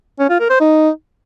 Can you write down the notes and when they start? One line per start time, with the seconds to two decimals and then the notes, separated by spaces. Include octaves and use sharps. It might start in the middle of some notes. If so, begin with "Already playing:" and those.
0.19 C#4
0.30 F4
0.40 A#4
0.50 C5
0.60 D#4